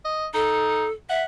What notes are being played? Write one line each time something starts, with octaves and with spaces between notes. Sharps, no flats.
D#5
D#4 A4
E5 F#5